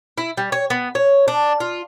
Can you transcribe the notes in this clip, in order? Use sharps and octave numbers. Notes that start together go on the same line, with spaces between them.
E4
G3
C#5
B3
C#5
D4
F4